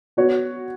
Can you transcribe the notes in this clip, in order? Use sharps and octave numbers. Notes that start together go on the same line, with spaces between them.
B3 F#4 C#5